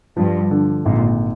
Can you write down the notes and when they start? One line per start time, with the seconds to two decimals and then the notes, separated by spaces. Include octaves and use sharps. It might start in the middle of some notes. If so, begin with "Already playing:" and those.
0.17 G2 F3
0.51 D3
0.85 G#1 A#2